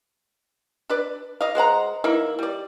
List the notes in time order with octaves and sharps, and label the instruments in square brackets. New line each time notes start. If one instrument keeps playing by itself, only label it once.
[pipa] D4 B4 D5
D#5 F5
G#3 C5 F#5 A#5
E3 A#3 D#4 E4
G3 D5